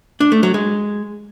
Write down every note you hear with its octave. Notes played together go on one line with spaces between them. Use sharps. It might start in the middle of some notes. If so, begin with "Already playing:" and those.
D4
A3
F#3
G#3